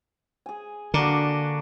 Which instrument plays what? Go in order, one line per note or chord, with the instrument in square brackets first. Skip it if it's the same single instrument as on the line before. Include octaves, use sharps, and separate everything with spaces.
[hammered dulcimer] G#4 G#5
[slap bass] D3 [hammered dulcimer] A#3 D4 F#4